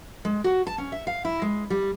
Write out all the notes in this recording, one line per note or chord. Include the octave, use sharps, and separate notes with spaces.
G#3
F#4
A5
C#4
E5
F5
E4
G#3
G3